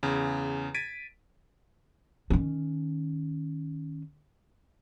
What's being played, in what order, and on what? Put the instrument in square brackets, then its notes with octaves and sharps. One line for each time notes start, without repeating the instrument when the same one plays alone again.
[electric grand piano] E2 C#3
G#6 A6 B6 D7 D#7
[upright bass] D#3 C#4